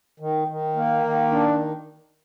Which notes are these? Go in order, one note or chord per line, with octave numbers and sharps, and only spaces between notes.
D#3
D#3
A#3
D#3
D4